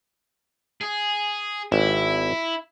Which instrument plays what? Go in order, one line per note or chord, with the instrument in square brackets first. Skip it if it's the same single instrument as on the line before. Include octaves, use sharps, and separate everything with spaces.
[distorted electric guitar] G#4
[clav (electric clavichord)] G#1 [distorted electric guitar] E4